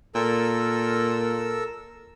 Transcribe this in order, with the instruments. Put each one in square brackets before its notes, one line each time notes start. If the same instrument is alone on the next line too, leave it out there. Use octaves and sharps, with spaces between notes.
[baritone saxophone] A#2 [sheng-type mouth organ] A4 A#4 E6